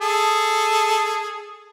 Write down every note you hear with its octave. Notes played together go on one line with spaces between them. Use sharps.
G#4 A4